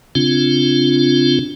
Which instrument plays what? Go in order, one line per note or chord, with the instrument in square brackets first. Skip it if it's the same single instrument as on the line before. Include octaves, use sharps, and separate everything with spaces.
[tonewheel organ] C#3 C4 D4 F4